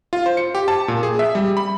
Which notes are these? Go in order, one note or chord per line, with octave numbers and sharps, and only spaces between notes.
F4
C5
C#7
G4
A5
A#2
G#4
E5
G3
B5